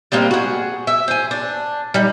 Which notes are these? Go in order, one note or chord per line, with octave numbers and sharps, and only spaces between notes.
G3 G#3 A#3 C4
F#4 G#4
E5
G#4 C5
D4
G3 D#4